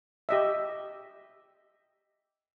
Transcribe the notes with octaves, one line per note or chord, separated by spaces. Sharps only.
G4 D#5 E5